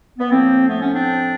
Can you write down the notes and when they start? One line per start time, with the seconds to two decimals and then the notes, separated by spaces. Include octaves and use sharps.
0.19 B3
0.31 A2 F3 A#3 C4
0.69 A3 B3
0.81 B3 C#4
0.95 C4 D4